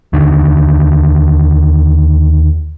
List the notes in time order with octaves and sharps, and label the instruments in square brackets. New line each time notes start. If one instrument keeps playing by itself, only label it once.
[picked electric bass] D#2 D3 D#3